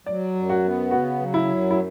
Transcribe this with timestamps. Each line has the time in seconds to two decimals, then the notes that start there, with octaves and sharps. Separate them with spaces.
0.06 F#3 D5
0.35 F#2
0.49 F#4
0.64 B3
0.91 C#3 F#4
1.20 F#3
1.34 E4
1.47 F#2
1.71 E4